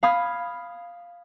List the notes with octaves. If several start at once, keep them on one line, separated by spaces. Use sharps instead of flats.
F5 B5 D#6 G#6